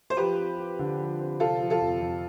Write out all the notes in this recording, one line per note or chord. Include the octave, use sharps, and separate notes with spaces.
C5
F3 G4 B4
C4
G4
D3
F3
C4
C3 F4 A4
F3
F4 A4
F2
F2